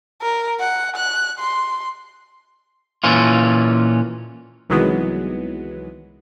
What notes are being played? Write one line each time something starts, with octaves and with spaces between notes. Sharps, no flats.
A#4
F#5
F#6
C6
A#2 E3 C#4 F4
C2 D#3 E3 F#3 G#3 B3